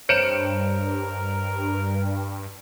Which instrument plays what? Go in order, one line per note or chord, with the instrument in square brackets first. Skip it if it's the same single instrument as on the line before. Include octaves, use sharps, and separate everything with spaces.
[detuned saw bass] G2 [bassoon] A#4 [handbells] C5 C#5 G6 [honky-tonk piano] C#7 D7 E7